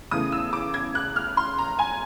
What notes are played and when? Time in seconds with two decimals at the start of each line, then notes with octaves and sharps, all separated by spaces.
0.11 E2 C#3 E3 A3 D#6
0.32 E6
0.53 D6
0.74 G#6
0.95 F#6
1.16 F6
1.37 C6
1.58 A#5
1.79 G#5